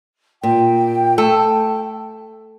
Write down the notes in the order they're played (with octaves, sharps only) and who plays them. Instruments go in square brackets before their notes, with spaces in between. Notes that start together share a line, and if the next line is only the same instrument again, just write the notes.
[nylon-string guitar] A#2 [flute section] G5
[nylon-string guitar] A3 [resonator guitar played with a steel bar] A4